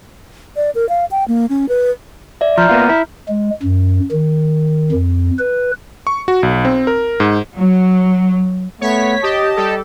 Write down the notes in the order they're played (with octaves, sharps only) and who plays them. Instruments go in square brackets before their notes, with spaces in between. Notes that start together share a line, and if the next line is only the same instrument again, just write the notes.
[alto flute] D5
A#4
F5
G5
A#3
C#4
B4
[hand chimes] D5 E5
[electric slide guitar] F3 [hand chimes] A#5 F6 G6
[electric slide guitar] A#3 B3 F4
E4
[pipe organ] G#3
F#2
D#3
F2
B4
[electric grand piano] C#6
F#4
B1
C4
A#4
G#2
[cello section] F#3
[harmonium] A3 B3 [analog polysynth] C#5 B6
[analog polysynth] G4 [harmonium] D#5 A5
[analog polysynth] G3 G4 A4